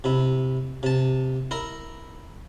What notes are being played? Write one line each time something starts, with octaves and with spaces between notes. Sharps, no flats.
C3 E4
C3 A5
E4 A#4 A#5